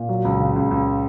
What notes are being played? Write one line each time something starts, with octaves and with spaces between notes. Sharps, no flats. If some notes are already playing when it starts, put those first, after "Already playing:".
Already playing: A#2
F#3
C#2
C#3
C#2
C#2